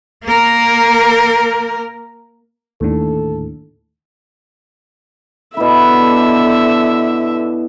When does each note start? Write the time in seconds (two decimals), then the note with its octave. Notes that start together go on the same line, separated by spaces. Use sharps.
0.24 A#3 A#4
2.81 D#2 A2 D3 A4
5.57 B2 D3 E4 E5